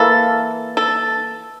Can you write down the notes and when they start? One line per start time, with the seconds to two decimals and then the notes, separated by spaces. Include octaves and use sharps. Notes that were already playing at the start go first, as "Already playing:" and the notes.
Already playing: E3 A#3 A4
0.77 A4